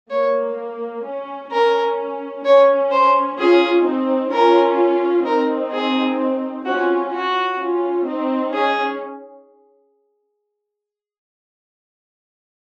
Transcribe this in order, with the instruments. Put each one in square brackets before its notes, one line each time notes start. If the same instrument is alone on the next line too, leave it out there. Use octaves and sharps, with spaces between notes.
[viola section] A#3 [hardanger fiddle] C#5
[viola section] C#4
[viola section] C#4 [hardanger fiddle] A#4
[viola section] C#4 [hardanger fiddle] C#5
[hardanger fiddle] C5
[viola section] C#4 F4 [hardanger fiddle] G#4
[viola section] C4 D#4
[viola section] C#4 F4 [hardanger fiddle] A#4
[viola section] C4 D#4 [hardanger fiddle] A#4
[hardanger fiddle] G#4
[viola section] C#4 F4 [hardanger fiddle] F#4
[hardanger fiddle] F#4
[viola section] C#4 F4
C4 D#4
[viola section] C#4 [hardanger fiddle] G#4